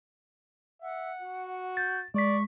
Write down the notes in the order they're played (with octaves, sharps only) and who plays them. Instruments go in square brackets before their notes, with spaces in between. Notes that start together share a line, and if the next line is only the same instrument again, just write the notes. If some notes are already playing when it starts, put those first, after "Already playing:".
[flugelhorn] E5 [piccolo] F#5
[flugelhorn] F#4
[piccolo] G6 [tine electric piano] A6
[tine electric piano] G#3 B6 [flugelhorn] D5 [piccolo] C#6